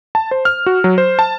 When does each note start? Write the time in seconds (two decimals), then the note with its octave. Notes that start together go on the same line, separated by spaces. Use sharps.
0.15 A5
0.31 C5
0.45 F6
0.66 F#4
0.84 F#3
0.98 C5
1.19 A5